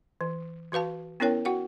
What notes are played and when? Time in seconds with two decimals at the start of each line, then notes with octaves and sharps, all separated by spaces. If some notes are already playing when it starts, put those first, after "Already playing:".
0.21 E3
0.72 E3 F#4 B4 F5 A5
1.20 B3 C#4 E4 A#4 C#5 G5
1.45 F#4 F#5 G5